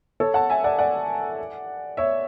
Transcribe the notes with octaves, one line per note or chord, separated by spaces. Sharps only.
A4 C#5
F#5 A5
E5 G#5
D5 F#5
D5 F#5
C#5 E5